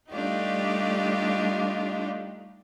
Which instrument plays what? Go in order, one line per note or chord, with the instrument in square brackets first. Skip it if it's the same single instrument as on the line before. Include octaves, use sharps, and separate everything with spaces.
[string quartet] G3 A3 D4 D#4 F4 G4